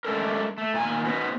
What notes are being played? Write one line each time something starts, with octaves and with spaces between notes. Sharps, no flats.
G#3 A3 C#4 D4 A4 A#4
A3
A#2 D#3 G#5
B3 C#4 D#4 F#4 B4 C5